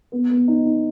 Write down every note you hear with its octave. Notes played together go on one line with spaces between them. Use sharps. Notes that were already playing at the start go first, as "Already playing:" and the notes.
B3
B3
D#4
D#4